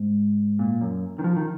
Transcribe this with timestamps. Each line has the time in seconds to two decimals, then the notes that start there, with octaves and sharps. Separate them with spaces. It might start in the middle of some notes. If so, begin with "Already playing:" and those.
Already playing: G#2
0.59 A#2
0.81 F#2
1.19 D#3
1.24 F3
1.36 D#3